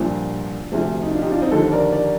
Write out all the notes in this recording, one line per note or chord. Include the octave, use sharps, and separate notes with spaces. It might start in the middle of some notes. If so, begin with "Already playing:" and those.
Already playing: C2 A#2 F3 D4
D2 C3 F3
D#4
D4 F4
D#4 G4
D4 F4
C4 D#4
D#2 D3 F3 A4 C5
A#4 D5
A#4 D5